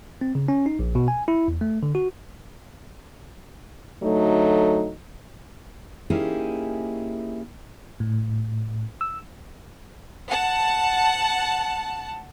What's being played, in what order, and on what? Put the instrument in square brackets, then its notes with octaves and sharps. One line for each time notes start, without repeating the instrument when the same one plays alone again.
[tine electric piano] C4
C#3
C#4
D#4
A#1
B2
G#5
E4
E2
A3
D3
F#4
[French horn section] D2 F#3 A3 D#4
[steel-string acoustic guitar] A#3 C#4 D#4 E4 G4 G#4
[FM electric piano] A2
E6
[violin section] F#5 A5